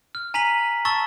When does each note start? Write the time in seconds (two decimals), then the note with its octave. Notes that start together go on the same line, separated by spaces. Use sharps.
0.15 F6
0.34 G#5 A#5 B6 D#7 F#7
0.85 A5 C#6 E6 A6 G7